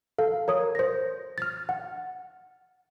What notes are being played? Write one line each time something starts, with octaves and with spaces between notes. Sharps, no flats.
A4 F5
A#4 C#5 D#6
C5 A#6
F6 A6
F#5